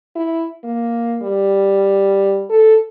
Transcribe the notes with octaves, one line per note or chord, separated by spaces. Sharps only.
E4
A#3
G3
A4